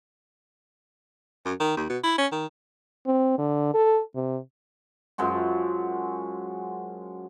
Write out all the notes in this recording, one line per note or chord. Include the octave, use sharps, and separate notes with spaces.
F#2
D#3
D#2
B2
E4
C#4
D#3
C4
D3
A4
C3
F#2 F3 G#3 F#4